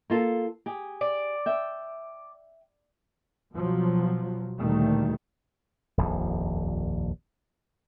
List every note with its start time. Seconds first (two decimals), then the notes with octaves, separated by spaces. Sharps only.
0.10 A#3 F4 A4
0.66 G4 G#4
1.01 D5
1.46 E5 G5
3.53 B2 F3 F#3
4.59 D2 A#2 D#3 G3 A3
5.98 D#1 A#1 F2